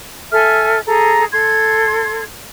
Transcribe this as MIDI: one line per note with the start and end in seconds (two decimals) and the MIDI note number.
0.32 0.80 69
0.32 0.80 76
0.32 0.80 80
0.32 0.80 89
0.87 1.25 68
0.87 1.25 69
0.87 1.25 82
1.32 2.23 69
1.32 2.23 84
1.32 2.23 92